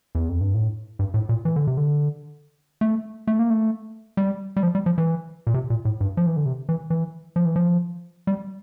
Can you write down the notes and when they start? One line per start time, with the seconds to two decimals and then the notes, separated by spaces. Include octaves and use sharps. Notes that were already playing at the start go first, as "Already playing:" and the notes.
0.15 E2
0.28 F2
0.41 G2
0.54 A2
0.99 G2
1.14 A2
1.29 A#2
1.45 E3
1.56 D3
1.67 C3
1.77 D3
2.81 A3
3.27 A3
3.39 A#3
3.50 A3
4.17 G3
4.57 G3
4.63 F3
4.75 G3
4.86 F3
4.98 E3
5.47 A#2
5.54 C3
5.70 A#2
5.85 A2
6.01 G2
6.17 F3
6.26 E3
6.37 D3
6.46 C3
6.69 E3
6.90 E3
7.36 F3
7.45 E3
7.56 F3
8.27 G3